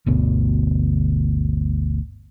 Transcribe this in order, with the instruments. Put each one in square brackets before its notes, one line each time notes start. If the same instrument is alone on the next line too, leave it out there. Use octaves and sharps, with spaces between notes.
[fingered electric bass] G1 D2 B2